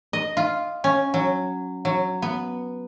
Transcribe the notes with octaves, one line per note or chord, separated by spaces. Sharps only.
D#5
F4
C#4
F#3
F#3
B3